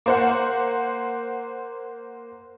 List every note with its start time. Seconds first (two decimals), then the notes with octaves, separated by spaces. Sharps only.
0.06 A#3 C5 F#5